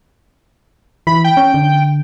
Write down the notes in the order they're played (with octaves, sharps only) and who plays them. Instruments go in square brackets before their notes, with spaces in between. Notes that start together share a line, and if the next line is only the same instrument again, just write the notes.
[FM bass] E3 [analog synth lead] B5
[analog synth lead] G5
[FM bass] C#4
D3